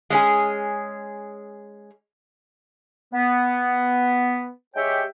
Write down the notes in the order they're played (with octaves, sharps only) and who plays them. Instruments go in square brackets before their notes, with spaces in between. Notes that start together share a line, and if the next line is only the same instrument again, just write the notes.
[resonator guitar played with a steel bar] G#3 C#4 G#4
[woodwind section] B3
G#3 G4 C#5 E5 G5